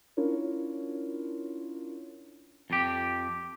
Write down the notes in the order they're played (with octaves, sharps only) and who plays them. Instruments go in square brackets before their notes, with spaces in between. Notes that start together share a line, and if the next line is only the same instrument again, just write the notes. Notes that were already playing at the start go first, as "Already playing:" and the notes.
[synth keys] C#4 D4 E4 F4 A#4 C#5
[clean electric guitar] F2 G4